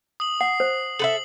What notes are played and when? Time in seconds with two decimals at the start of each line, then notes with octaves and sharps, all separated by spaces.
0.20 D#6 F#7
0.41 F#5 C7
0.60 C5
0.99 A4 B4 E5 F#7